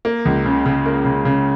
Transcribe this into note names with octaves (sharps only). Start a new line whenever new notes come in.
A#3
C#2
C#3
C#3
A#3
C#3
C#3